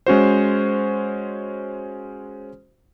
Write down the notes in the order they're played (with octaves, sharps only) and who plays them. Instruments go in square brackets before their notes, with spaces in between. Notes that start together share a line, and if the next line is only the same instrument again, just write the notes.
[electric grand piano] G#3 C#4 F#4 C5